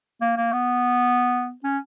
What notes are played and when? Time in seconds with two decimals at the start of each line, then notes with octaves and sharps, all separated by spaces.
0.21 A#3
0.37 A#3
0.53 B3
1.64 C#4